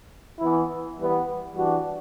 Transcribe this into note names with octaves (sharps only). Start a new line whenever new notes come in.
E3 B3 E4
E3 G3 B3
E3 G3 D4 F#4